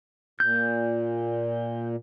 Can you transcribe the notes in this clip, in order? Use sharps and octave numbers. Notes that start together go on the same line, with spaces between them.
A#2 G6